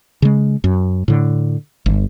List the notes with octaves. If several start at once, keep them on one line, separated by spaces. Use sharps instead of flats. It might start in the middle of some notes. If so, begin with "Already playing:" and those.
C#3 G#3
F#2
A2 D3
G1